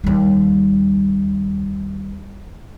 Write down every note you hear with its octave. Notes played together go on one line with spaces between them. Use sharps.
D#2 G3